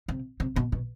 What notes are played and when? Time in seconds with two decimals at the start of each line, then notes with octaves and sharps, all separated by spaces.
0.08 C3
0.40 C3
0.56 B2
0.72 B2